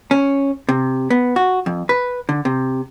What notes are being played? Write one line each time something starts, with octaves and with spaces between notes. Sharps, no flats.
C#4
C3
B3
F#4
F2
B4
D3
C3